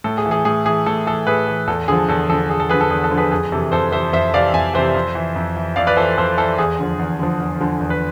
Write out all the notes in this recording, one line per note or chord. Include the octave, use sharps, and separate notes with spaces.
A2 A4
G#4
E3
G#4
A2 G#4
E3 G#4
A2 A4
E3 A4
A2 G#4 B4
E3 G#4
E2 A4
D3 F3 G#4
E2 A4
D3 F3 A4
E2 G#4
A4
D3 F3 G#4 B4
A4
E2 G#4
A4
D3 F3
G#4 B4
F2 G#4
C3 E3 A4
F2 A4 C5
C3 E3 C5 E5
F2 C5 E5
C3 E3 D5 F5
F2 E5 G#5
C3 E3 C5 E5
F2
E3
F2
E3
F2 D5 F5
B4 D5
E3 A4 C5
F2 A4 C5
E3 A4 C5
E2 G#4
D3 F3
E2
D3 F3
E2
D3 F3
E2
B4